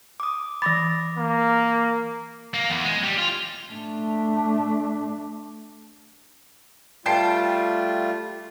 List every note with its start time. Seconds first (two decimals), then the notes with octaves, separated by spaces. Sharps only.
0.20 D6 D#6
0.62 E3 B5 D6 A6 A#6
1.18 A#3
2.54 A#3
2.70 E2
2.84 G#3
3.03 G3
3.18 F4
3.73 A3 D4
7.06 G3 A3 F4 G5 A5 C7